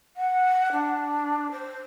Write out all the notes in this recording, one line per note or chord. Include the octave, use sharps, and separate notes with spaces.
F#5
D4
C5